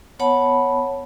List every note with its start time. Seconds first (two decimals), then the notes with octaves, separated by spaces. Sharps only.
0.19 B3 C#5 F#5 A5 B5